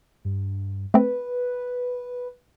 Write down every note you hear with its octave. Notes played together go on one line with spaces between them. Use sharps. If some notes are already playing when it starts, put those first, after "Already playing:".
G2
A3 C4 B4